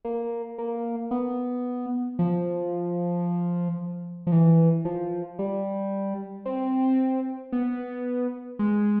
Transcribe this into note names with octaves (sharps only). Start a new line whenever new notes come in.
A#3
A#3
B3
F3
F3
E3
F3
G3
C4
B3
G#3